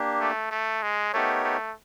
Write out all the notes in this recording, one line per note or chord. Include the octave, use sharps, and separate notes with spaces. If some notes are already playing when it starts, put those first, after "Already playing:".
Already playing: A#3 D4 G4
A3
A3
G#3
A3 B3 D#4 G4 A#4 C#5
A3